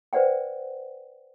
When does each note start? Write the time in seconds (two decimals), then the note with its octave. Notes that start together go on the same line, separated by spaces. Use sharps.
0.13 B4 C5 D5 F#5 G5